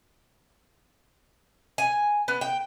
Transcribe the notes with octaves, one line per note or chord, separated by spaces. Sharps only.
G#5
B3
G5